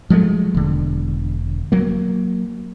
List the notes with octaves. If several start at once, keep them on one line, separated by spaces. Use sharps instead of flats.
F3 F#3 G#3 A3
E1 D3
F#3 A#3